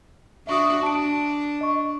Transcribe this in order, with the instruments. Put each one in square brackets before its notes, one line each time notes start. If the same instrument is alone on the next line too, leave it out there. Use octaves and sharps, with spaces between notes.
[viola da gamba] D4 F#4 [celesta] E5 C#6 D#6
[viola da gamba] D4 [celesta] A5 D7
[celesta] D#5 C#6